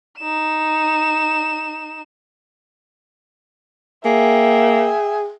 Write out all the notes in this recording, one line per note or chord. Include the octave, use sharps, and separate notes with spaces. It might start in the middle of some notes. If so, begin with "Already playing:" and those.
D#4 E7
A#3 G#4 E5 G5